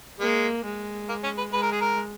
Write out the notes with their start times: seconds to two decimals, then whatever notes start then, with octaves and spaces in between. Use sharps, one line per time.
0.20 G#3 A#3
0.64 G#3
1.09 A#3
1.23 C#4
1.38 B4
1.52 G#3 B4
1.62 A#4
1.72 G#4
1.81 A#4